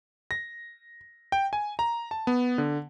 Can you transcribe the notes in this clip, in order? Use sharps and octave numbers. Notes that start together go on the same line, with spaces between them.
A#6
G5
G#5
A#5
A5
B3
D3